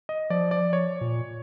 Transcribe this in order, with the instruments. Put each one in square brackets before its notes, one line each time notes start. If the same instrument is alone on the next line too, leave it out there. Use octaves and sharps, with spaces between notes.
[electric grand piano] D#5
[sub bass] F3 [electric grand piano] D5
[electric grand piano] D5
C#5
[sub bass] A#2